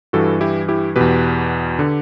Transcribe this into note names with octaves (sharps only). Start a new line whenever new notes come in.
G2 E3 F#4 A4
E4 G4
E4 G4
E2 B2 G4 B4
D3